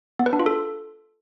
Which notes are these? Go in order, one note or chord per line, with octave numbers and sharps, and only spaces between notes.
B3
B4
D4
F4
A4